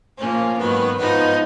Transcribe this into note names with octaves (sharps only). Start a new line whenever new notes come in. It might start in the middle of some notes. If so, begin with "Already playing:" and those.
A#2 F3 A#3 C#4
G#2 D#3 F#3 B3
G#2 F3 B3 D#4